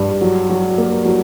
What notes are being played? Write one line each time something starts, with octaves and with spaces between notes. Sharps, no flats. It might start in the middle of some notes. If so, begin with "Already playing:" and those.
Already playing: G2
F#3
F#3
A#3
F#3